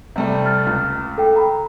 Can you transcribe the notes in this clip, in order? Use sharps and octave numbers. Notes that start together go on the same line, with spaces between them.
C3 G3 A3
F6 A6
C#2
A4 G5
A#5 B5